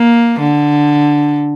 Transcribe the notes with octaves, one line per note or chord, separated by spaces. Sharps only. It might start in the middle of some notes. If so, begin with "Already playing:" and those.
Already playing: A#3
D3